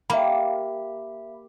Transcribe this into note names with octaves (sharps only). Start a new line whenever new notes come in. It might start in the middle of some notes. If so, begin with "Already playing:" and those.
A#3 G4 E5 B5